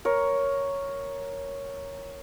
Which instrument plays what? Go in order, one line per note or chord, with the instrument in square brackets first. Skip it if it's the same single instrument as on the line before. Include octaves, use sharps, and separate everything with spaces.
[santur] A#4 C#5